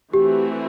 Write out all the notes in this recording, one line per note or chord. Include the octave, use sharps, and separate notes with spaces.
E3 A3 C4 F#4 G4 A4